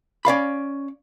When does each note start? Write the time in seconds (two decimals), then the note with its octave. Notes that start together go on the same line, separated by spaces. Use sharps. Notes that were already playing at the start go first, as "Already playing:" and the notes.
0.25 C#4 D5 F5 B5